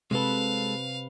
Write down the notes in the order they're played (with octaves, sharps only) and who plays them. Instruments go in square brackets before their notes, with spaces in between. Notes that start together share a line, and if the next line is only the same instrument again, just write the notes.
[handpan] C3 B4 [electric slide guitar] G#3 A4 [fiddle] F5